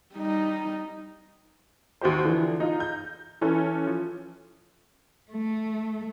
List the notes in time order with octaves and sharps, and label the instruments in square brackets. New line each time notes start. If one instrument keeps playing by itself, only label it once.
[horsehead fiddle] G3 D#4
[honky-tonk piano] D#2 F#4 G4 C5
D3 E3 F3
D#4 F4
G6
E3 C#4 A4
F3
[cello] A3